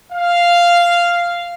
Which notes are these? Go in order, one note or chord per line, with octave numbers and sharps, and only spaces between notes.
F5